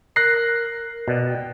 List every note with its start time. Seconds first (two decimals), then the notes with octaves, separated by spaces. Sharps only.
0.16 A#4 F#6 A#6 C7
1.08 B2 D5
1.28 G5